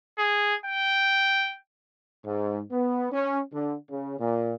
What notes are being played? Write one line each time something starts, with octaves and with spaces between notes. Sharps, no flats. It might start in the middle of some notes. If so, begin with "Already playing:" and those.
G#4
G5
G#2
B3
C#4
D3
C#3
A#2